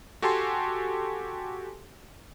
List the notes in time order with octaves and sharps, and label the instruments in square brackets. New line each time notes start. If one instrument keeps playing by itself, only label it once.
[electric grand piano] F#4 G4 A4 G#5 A5 C6